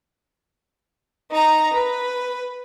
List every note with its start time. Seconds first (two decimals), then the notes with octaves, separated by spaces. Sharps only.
1.31 D#4 A#5
1.73 B4